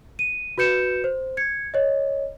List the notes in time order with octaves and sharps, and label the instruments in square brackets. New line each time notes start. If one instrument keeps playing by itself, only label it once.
[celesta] D#7
F#4 B4 G6 C#7 E7
C5
G#6 C#7
C#5 D#5